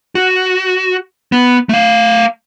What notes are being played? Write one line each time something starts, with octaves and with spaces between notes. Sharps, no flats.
F#4
B3
A3 F5